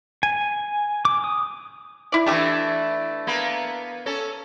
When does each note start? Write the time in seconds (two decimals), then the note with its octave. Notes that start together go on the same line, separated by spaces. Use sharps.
0.23 G#5
1.05 D6
1.24 D#6
2.12 E4 D5
2.26 E3 A3 D4 G4 E5
3.27 A#3 B3 B4
4.06 C#4 A4